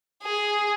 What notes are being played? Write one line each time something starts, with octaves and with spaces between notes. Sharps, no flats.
G#4